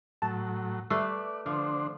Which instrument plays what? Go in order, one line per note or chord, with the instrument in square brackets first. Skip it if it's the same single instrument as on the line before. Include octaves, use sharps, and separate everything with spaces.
[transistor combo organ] A2 F#3 [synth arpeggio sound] A5
[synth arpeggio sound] G3 E5 C7 [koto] A3 B4 [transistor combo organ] D5
[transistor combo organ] D3 D4 C5 [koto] F3